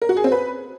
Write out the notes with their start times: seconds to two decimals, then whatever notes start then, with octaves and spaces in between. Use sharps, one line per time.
0.02 A#4
0.09 F#4
0.17 G#4
0.24 C4
0.32 B4